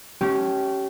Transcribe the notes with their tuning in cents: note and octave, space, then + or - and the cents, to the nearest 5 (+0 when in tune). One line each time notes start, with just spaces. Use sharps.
A3 -40 C#4 +0 G4 -25